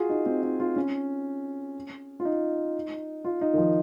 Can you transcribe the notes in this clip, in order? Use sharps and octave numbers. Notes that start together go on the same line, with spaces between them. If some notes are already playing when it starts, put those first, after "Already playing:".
Already playing: F4 F#4 G#4
D#4
C4
D#4
F4
C#4
F4
D#4
F4
D#4
D#3
F3